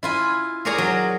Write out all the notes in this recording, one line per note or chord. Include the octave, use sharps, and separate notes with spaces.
E4 F4 G#5
G#4 A#4 C#5 D5 G#5 A#5
F#3